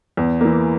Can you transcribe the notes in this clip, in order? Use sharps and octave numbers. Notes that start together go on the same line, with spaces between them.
E2
E3 A#3